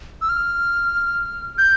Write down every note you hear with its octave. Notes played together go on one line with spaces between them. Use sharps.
E6
F6
G6